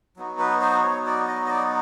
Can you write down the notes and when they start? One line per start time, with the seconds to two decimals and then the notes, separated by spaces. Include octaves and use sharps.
0.16 F#3 B3 D#4 F#4
0.39 B4
0.61 C5
0.83 C#5
1.06 D5
1.28 D#5
1.46 D#5
1.50 D5